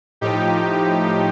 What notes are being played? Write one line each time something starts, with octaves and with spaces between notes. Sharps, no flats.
A2 F3 D#4 G4